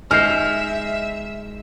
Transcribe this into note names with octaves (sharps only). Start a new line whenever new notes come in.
G#3 D#4 E5 F6 G6 C7